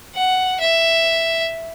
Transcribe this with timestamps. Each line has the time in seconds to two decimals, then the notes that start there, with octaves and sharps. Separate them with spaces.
0.15 F#5
0.61 E5